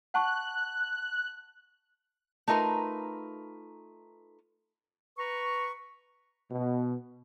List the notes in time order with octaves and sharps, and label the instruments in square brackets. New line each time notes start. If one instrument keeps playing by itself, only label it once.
[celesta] F#5 A5 C#6 [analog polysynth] F#6
[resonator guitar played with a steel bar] A3 D#4 F4 A#4 B4
[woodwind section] B4 A#5 C#6
[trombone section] B2